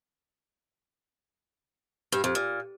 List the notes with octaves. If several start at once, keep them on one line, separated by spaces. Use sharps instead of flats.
G2
F2
A#2